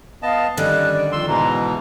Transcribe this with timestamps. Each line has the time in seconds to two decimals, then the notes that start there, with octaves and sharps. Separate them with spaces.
0.23 B3 D#5 F5 A5
0.57 D3 D#3 G3 C#4 F#6
0.94 D5
1.12 F2 C6 E6
1.27 G#2 B2 E3 A#5